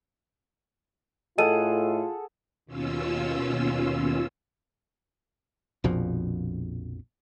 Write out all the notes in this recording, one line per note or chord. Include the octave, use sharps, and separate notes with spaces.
A2 F4 G#4 A4 D#5 F#5 D#7
D#2 B2 C#4 F4 E6
A#1 F2 B2 F3